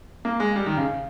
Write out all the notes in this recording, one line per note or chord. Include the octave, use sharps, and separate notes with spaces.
A#3
G#3
G3
D#3
C#3